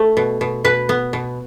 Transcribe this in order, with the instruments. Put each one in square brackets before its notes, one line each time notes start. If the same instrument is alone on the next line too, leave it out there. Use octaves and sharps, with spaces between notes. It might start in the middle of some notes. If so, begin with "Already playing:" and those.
Already playing: [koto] A3
B2
B2
B2 B4
B3
B2